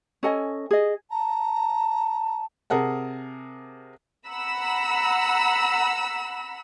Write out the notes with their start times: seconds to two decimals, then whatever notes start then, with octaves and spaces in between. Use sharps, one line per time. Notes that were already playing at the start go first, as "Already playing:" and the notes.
0.23 C#4 A4 D#5 G#5
0.71 G#4 D#5
1.11 A5 A#5
2.70 C3 G#4 A#4 F#5 A5
4.28 F#5 A#5 B5 E6